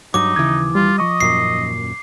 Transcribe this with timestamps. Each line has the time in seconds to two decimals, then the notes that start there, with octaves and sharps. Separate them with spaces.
0.14 G2 F#3 D#4 D6
0.36 D#2 C#3 E3 D#6 G#6
0.75 G3 F4
0.98 F3 D#5 C#6 D#6
1.20 D#1 F#2 A#2 C7